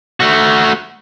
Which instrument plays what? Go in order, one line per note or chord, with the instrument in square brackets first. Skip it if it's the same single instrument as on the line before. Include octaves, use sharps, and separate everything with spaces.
[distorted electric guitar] A3 F#4